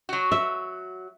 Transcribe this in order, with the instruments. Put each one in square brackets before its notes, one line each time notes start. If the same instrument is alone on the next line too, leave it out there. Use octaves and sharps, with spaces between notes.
[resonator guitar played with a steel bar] F#3 F#4
[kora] E5